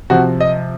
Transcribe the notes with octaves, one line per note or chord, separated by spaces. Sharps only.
C3 F3 F#4
D#5